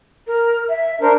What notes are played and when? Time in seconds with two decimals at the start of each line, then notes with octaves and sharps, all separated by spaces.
0.27 A#4
0.69 E5
1.02 D4 A#4 C5